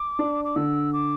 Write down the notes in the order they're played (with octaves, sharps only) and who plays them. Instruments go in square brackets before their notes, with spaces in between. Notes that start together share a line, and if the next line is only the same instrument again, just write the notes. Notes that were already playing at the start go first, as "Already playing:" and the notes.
Already playing: [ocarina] D6
[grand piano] D4
[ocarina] D6
[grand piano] D3 [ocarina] E6
[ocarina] D6